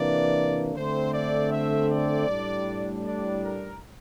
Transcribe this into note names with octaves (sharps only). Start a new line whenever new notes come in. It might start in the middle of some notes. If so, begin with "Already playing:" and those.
Already playing: C3 E3 A#3 D4 D5
D3 A3 C4 C5
D5
E5
D5
A2 G3 D4
D5
A#4